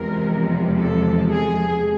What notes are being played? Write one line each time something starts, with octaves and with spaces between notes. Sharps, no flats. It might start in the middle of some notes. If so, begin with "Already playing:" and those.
Already playing: E2 C3 F3 G#3 A#4
A4
G#4